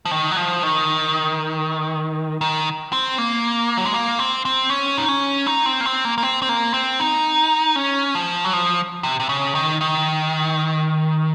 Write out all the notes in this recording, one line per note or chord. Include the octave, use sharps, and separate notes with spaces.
F3
D#3
F#3
F3
D#3
D#3
C4
A#3
F#3
G#3
A#3
C4
C4
C#4
D#4
C#4
D#4
C4
A#3
C4
A#3
A#3
C4
C4
A#3
C4
D#4
C#4
F3
F#3
F3
C3
C3
C#3
D#3
D#3